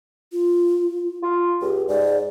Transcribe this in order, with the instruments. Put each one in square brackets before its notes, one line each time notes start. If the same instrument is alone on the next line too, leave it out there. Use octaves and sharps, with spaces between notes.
[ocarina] F4
[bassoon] F4
[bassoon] C#2 [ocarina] G4
[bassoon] G#2 [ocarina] D5